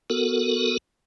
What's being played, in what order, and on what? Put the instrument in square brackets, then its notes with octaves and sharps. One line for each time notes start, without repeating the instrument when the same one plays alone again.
[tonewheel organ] B3 F#4 A4 A#4